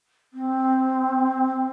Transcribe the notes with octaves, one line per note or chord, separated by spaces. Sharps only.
C4